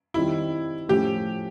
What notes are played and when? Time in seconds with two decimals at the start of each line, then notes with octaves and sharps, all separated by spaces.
0.14 D#3 G3 C4 E4 F4
0.89 A2 F3 A3 C#4 G4